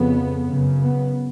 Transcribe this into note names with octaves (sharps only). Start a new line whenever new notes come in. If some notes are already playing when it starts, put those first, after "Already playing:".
Already playing: F2 C#3 B3
F#2 C#3
B3